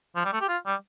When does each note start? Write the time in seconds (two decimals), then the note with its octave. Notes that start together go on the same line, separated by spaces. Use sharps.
0.16 F3
0.25 G3
0.33 A3
0.41 G4
0.49 F4
0.66 G3